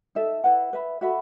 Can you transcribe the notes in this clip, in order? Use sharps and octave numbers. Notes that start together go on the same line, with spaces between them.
D#4 A4 E5
E4 B4 F#5
B4 E5 B5
F#4 A4 E5 B5